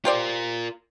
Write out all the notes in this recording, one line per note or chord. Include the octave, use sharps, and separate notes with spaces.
F4 G4 A#4 C5 D5